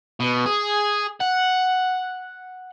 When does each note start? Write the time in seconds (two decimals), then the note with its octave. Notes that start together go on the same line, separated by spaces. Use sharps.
0.20 B2
0.46 G#4
1.21 F#5